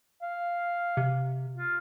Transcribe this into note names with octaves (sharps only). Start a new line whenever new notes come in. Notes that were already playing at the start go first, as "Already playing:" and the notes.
F5
C3
F4